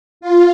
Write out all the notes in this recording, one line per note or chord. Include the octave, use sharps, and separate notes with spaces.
F4